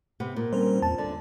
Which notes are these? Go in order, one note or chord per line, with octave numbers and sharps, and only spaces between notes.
C3 B3
A#2
G3 C4 C#4 A#4 C5
E2 A5
D3 D5